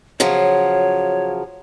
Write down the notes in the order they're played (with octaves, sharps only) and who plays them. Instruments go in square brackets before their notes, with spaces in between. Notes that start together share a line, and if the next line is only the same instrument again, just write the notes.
[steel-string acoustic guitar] C#3 F3 F#3 [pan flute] C#5